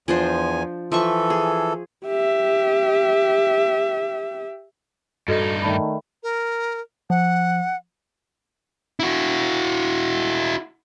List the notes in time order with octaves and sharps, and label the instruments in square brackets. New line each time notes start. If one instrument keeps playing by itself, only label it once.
[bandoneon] E2 G#5 [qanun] F3 D4 C5
[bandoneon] E3 A4 [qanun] F3 E5 C#6
[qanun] G#4
[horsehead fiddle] G4 E5
[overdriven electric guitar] G2 D#4 [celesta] F#4 A4 D#5
[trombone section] D#3 A3 [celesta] D5 A5 B5
[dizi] A#4
[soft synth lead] F3 [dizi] F#5
[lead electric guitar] E4 F#4